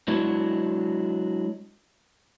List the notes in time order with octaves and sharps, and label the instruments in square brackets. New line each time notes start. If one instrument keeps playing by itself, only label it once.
[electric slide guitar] F#3 G#3 D4 E4 F#4